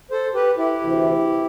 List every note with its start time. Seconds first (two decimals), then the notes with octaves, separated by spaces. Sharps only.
0.11 A4 C5
0.34 G4 B4
0.58 E4 G4
0.80 D2 C3 E3